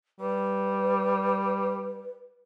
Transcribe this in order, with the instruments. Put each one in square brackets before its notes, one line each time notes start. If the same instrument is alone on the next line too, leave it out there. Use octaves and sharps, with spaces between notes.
[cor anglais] G3 [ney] B4